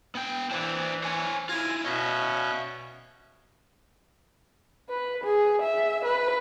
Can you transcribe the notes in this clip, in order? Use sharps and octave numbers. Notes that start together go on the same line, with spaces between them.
B3 G5
E3 D4 C5 D5
C5 C#5 G#5
E4 F4 G#5 A#6
B2 C#4 D#5 E5
B4
G#4
E5
B4